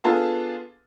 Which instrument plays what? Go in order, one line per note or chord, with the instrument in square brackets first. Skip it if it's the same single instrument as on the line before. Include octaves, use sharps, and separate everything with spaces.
[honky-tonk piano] B3 D4 F4 G#4 A4